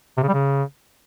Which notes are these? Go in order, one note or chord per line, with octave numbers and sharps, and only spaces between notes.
C3
C#3
G3
C#3